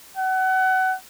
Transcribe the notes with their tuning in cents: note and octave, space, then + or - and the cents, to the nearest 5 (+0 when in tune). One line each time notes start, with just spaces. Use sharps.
F#5 +25